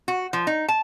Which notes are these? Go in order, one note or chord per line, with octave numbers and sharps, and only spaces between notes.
F#4
F3
D#4
A5